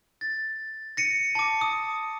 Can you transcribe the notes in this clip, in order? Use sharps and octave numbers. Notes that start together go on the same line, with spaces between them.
A6
A#6 C#7 D#7
A5 D6
D#6